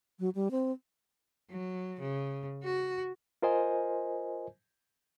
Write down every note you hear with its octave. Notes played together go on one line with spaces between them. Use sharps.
F#3
G3
C4
F#3
C#3
F#4
F4 A#4 C5 D#5 G#5